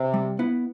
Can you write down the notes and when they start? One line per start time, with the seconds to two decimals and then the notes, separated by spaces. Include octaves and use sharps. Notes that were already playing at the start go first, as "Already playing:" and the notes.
Already playing: C3
0.14 G3
0.39 B3 E4